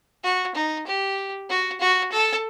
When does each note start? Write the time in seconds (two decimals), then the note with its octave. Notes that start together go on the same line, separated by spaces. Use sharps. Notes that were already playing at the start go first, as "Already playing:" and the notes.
0.23 F#4
0.55 D#4
0.86 G4
1.49 F#4
1.80 F#4
2.12 A4